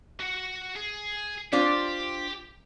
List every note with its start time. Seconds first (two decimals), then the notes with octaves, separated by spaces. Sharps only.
0.20 F#4 F#5
0.76 G#4
1.53 D4 F4 G4 C5